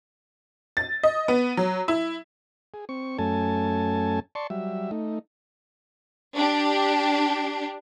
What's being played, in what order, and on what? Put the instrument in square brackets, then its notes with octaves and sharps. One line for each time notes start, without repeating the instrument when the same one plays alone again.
[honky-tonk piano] A6
D#5
B3
F#3
E4
[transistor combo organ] G#4
C4 C#6
F#2 A3 C#4 A4 G#5 A5
D5 A5 C6 C#6
F#3 G3 E5
A3 D#4
[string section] D4 G4